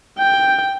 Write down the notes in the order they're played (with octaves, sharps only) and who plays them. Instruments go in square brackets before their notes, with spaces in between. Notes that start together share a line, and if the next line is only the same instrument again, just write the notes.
[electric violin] G5